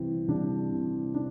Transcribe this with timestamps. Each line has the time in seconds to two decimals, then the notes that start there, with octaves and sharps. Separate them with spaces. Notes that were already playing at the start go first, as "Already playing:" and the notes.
Already playing: C2 C3 E3 C4
0.28 C2 D4
0.72 C3 E3
1.14 D4